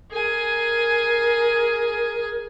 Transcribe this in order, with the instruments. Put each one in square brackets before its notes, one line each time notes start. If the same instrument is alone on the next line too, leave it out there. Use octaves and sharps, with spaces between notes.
[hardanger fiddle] G#4 G#5 [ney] A#4